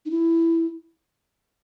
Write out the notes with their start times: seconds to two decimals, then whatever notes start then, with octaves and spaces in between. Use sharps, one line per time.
0.05 D#4
0.11 E4